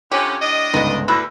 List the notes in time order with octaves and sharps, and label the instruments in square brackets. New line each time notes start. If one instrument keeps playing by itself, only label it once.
[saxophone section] F2 D3 C#4 [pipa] G4
[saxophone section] A2 D4 D#5
[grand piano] G1 C#2 G#2 [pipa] B3 D#4
[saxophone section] D2 [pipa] E4 B4 [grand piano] B5 E6 A#6